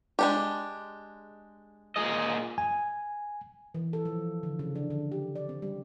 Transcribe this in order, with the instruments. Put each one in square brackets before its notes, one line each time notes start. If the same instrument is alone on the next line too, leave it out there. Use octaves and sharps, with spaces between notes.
[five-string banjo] G#3 D4 G4
[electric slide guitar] A#2 G#4 D#5
[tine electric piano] G#5
[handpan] E3
A4
F3
D3
C#3
D4
D3
G4
D5
C4
G3